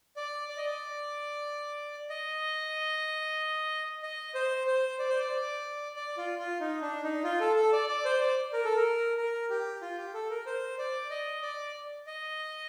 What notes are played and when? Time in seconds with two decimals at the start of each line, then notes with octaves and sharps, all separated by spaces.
0.16 D5
0.49 D5
0.57 D#5
0.66 D5
2.09 D#5
4.03 D#5
4.35 C5
4.67 C5
4.99 D5
5.09 C5
5.19 D5
5.96 D5
6.17 F4
6.39 F4
6.60 D#4
6.81 D4
7.03 D#4
7.24 F4
7.40 A4
7.56 A4
7.73 D5
7.89 D5
8.05 C5
8.21 D5
8.53 A#4
8.65 A4
8.76 A#4
9.17 A#4
9.50 G4
9.82 F4
9.98 G4
10.14 A4
10.30 A#4
10.46 C5
10.78 D5
11.10 D#5
11.42 D5
12.07 D#5